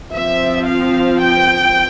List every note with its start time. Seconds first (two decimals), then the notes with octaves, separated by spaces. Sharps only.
0.11 F3 C4 E5
0.67 F5
1.20 G5